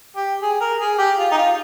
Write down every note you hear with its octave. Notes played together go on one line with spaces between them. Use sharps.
G4
G#4
A#4
G#4
G4
F4
D#4
F4